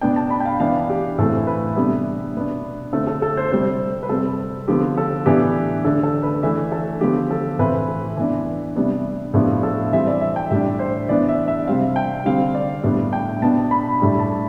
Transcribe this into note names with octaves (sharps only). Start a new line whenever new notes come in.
B2 B3 D4 G5
A5
B5
G5
F5
E3 B3 D4 F5
G4
A2 E3 A3 C4 A4
B4
C3 G3 B3 D4
B2 B3 D4
D3 A3 C4 A4
A4
A4
C5
C3 G3 C4 C5
B4
C3 G3 C4 A4
D3 F3 B3 G4
A4
A2 E3 B3 D4 G4
D3 A3 D4 A4
A4
B4
E3 A3 D4 E5
A4
D3 F3 B3 G4
A4
A2 E3 A3 C4 B4
A4
E3 B3 D4
C3 G3 B3 D4
A2 F3 B3 D4 G4
A4
E3 G3 C4 E5
D5
E5
G5
A2 G3 D4 E5
C5
E3 B3 D4 D5
E5
E5
C3 G3 C4 F5
G5
D3 G3 C4 F5
D5
A2 G3 B3 D4
G5
B2 B3 D4 A5
B5
A2 G3 D4 B5
A5